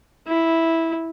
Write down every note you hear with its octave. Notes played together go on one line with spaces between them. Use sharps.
E4